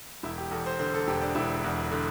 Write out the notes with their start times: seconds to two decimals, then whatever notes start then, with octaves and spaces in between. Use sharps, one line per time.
0.23 E1 E4
0.38 G4
0.51 E2 A4
0.66 C5
0.79 D3 C5
0.94 A4
1.07 E1 G4
1.21 D4
1.35 E1 E4
1.64 E2
1.92 D3